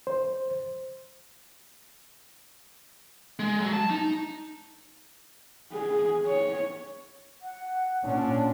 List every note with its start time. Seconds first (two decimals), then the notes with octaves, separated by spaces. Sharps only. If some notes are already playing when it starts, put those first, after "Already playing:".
0.07 C5
3.39 G#3
3.60 F#3
3.73 A5
3.90 D#4
5.73 G#4
6.26 C#5
7.42 F#5
8.04 A#2 C#4 D4